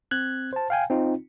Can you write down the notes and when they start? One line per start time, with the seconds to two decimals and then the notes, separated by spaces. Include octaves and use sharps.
0.11 C4 F#6 G#6
0.53 C5 A5
0.70 F5 G5 G#5
0.90 C4 D#4 F4